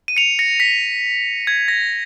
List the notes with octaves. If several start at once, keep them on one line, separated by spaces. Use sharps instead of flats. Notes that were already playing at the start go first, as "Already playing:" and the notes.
D#7
C#7 F7
A#6 C#7
B6
G#6
A#6